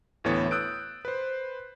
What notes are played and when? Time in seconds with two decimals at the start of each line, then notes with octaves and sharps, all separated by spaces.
0.24 D2 A2 E3 B3 C#5 A6
0.51 D#6 E6 F#6 G6 D7
1.05 B4 C5